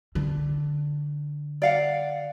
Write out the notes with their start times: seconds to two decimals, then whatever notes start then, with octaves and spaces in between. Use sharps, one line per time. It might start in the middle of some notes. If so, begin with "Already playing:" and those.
0.15 D3
1.62 D5 F5 F#5